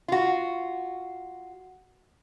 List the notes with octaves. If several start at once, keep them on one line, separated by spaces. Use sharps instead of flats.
F4 F#4